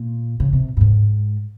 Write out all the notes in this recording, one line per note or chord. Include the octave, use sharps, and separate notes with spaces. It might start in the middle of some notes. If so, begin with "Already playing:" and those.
Already playing: A#2
C#3
C3
G2
G#2